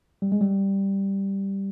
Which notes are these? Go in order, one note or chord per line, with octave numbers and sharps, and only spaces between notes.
G3
G#3
G3